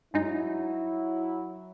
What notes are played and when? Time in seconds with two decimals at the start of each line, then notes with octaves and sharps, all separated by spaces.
0.14 G2 F#3 G#3 D#4 E4